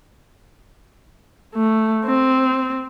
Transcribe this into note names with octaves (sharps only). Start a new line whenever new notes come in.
A3
C4